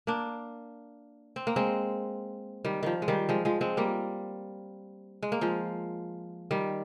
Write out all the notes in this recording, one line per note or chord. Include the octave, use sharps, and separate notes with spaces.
A#3 D4
C4
A#3
G#3 C4
D#3 G3
D#3 F3
G#3
D#3 G3
F3 G#3
F3 G#3
G#3 C4
G3 A#3
G#3
A#3
F3 G#3
D#3 G3